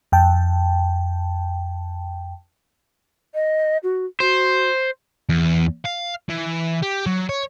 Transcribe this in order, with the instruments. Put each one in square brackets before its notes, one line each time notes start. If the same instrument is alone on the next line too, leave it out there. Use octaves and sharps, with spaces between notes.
[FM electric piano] F2 G5 A5
[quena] D#5
F#4
[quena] F#4 [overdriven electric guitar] C5
[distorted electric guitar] E2
F5
E3
G4
F#3
C#5